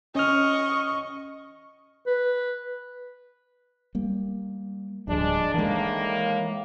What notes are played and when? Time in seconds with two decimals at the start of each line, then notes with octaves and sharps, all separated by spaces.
0.15 C#4 D#5 C#6 F6
2.06 B4
3.95 G3 A#3
5.08 D1 G2 F3 G#3 D4
5.54 A2 D#3 E3 G#3 A#3